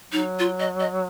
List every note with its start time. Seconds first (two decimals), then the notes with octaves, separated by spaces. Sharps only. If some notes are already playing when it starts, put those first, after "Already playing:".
0.12 F#3 D#4
0.39 F4
0.60 D#5
0.80 D#5